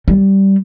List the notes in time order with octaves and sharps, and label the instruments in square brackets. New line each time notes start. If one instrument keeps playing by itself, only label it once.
[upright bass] G3